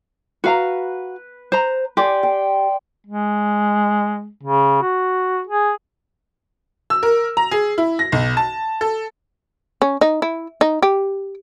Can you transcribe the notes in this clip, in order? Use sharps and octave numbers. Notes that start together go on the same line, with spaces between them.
F#4 B4 F5 A#5
C5 A#5
G4 D5 G#5 C6
G5
G#3
C#3
F#4
G#4
E6
A#4
A#5
G#4
E4
A#6
B1
A5
A4
C#4
D#4
E4
D#4
G4